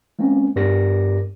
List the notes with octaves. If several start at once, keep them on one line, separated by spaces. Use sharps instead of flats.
G#3 A#3 C4 C#4
G2 B3 G4 A#4 D5 A#6